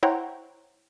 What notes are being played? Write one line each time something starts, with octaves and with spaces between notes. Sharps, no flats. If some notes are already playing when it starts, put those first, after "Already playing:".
E4 C5 C#5 F#5 G5 A#5